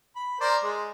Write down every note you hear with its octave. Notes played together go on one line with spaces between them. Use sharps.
B5
A#4 C5 D5
G#3